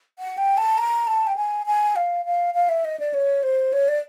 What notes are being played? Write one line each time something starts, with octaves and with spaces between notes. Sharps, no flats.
F#5
G5
A5
A#5
A5
G5
G#5
G#5
F5
F5
F5
E5
D#5
D5
C#5
C5
C#5
D5